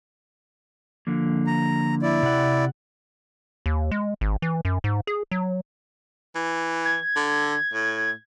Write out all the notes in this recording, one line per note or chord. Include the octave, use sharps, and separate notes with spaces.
D3 F3 A#3
A#5
E4 D5
C3 F#5
D#2
G#3
G#1
E3
F#2
G#2
G#4
F#3
E3
G#6
D3
A2